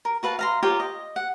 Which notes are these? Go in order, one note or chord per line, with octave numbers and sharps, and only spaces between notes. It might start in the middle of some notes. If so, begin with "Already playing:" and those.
A#4
F#4 B4 F5 A5
F5 A#5 C6
F4 G4 A#4 C#5
D#5
F#5